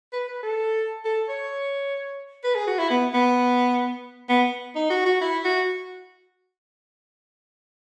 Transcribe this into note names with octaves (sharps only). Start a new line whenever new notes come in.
B4
B4
A4
A4
C#5
B4
G#4
F#4
E4
B3
B3
B3
D#4
F#4
F#4
E4
F#4